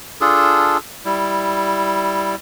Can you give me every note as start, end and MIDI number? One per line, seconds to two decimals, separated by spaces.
0.21 0.78 62
0.21 0.78 65
0.21 0.78 68
0.21 0.78 69
1.05 2.35 55
1.05 2.35 64